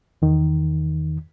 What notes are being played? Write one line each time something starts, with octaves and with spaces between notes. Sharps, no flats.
E2 D#3